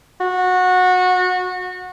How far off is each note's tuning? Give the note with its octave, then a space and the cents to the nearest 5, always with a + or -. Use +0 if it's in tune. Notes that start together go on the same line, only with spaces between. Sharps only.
F#4 -20